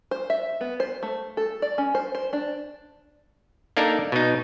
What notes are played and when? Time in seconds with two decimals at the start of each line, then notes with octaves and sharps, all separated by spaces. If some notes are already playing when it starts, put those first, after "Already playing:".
0.11 C5
0.30 E5
0.61 B3
0.80 C5
1.03 A3
1.37 A4
1.62 D5
1.78 C#4
1.95 C5
2.15 C5
2.33 D4
3.77 A#3 D4 D#4 A4 A#4
4.12 B2 D#4